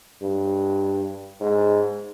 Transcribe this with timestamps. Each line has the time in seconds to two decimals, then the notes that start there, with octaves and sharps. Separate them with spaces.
0.22 G2
1.41 G#2